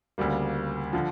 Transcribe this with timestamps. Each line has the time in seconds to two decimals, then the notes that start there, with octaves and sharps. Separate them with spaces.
0.18 D2 C#3 G3 A#3
0.93 D3 F3